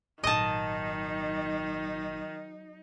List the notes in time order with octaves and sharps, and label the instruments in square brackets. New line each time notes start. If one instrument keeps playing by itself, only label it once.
[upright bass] G#1 A#2 [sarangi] D#3 [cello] F#3 D#4 [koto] D#5 A5